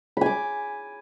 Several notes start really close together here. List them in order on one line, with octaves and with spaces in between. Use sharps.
B5 G#5 D6